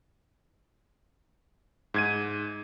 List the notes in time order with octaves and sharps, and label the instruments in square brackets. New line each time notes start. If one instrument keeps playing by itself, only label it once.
[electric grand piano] G#2 G#6 D#7